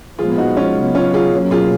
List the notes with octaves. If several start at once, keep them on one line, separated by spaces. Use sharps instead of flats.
A#2 F3 G#3 B3 F4 G#4
D#4 F#4
C#4 F4
C#3 F#3 B3
C#4 F4
F4 G#4
B2 F#3 A#3 C#4
F4 G#4